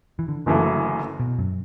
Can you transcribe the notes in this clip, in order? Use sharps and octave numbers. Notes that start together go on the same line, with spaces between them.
E3
D3
F#1 F#2 D3 E3 A3
B2
F#2